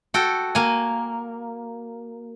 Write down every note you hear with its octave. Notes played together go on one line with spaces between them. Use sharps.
F#4 A4 G5
A#3 G#5